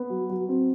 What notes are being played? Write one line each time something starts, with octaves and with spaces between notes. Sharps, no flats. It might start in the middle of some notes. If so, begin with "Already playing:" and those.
Already playing: B3
F#3
F#3
C4